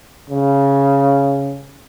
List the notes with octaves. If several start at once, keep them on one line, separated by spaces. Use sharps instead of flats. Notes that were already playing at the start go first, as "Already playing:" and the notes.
C#3